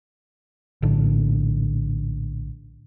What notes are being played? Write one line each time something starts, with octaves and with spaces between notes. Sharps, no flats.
A#1 A2 D3